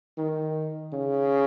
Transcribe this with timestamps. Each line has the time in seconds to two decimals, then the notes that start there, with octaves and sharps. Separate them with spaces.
0.17 D#3
0.93 C#3